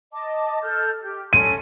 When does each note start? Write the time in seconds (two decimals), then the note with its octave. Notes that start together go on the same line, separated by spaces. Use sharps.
0.13 D#5 A5 D6
0.63 A4 F6 G6
1.01 G4
1.33 C#4 A4 C6 D#7